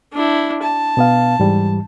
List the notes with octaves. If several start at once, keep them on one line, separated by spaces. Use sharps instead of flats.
D4 E4
A5
B2 B3 F5
G#2 E3 G3